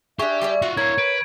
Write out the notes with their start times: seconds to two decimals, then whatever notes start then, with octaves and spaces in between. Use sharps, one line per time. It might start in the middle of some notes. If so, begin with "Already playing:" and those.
0.19 D4 G4 G#4 E5 C#6
0.41 G3 G#4 D5
0.62 F4 F#4 F#5
0.77 E4 A#4 C#5 F5 G#6
0.98 B4 D7